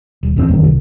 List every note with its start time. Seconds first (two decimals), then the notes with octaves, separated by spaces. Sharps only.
0.23 D#1
0.36 F1 E2 A2 C4
0.48 F#1 F2 D#3
0.64 C2